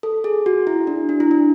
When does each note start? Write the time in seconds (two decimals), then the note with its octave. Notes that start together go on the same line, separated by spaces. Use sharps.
0.03 A4
0.24 G#4
0.46 F#4
0.67 E4
0.87 D4
1.09 D4
1.20 E4
1.31 D4